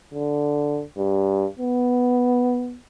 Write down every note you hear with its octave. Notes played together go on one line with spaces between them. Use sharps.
D3
G2
B3